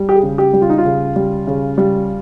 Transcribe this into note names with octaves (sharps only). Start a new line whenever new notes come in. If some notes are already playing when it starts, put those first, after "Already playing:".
Already playing: G3
G4
G#4
C#3
G4
G3
F4
D#4
F4
C#3
G3
C#3
G3